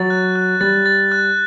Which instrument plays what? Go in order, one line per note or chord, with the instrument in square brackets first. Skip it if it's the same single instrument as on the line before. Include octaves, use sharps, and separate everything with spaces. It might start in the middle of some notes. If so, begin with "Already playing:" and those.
Already playing: [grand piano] F#3 [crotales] A6
[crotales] F#6
F#6
[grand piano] G3 [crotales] A6
[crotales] A6
F#6